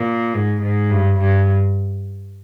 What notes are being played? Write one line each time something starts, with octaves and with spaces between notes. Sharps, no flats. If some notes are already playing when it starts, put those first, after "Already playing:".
Already playing: A#2
G#2
G#2
G2
G2